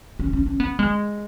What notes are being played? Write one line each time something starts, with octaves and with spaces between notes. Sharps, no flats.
C#4
C#4
C#4
B3
G#3